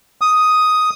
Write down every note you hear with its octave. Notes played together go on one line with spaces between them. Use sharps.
D#6